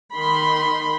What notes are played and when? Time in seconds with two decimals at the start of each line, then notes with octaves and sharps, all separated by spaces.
0.15 D#3 B5 C6